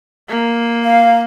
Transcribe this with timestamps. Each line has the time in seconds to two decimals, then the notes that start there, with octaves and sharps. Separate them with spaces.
0.29 A#3
0.84 F5